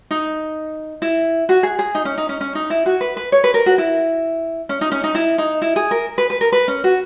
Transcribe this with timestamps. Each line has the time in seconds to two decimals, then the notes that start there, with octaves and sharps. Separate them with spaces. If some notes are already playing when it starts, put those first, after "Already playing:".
0.11 D#4
1.02 E4
1.49 F#4
1.63 G#4
1.79 G#4
1.95 D#4
2.05 C#4
2.18 D#4
2.29 C#4
2.41 C#4
2.55 D#4
2.70 E4
2.86 F#4
3.01 B4
3.17 B4
3.32 C#5
3.44 B4
3.54 A#4
3.66 F#4
3.78 E4
4.69 C#4
4.81 D#4
4.92 C#4
5.04 D#4
5.15 E4
5.38 D#4
5.62 E4
5.76 G#4
5.91 A#4
6.18 B4
6.30 B4
6.41 A#4
6.52 B4
6.68 C#4
6.84 F#4